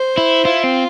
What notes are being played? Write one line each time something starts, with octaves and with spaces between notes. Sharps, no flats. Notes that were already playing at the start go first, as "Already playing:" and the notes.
Already playing: C5
E4
E4 F4
C4